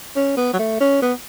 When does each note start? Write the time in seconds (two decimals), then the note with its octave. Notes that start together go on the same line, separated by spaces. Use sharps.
0.16 C#4
0.37 B3
0.53 F#3
0.59 A3
0.80 C#4
1.02 B3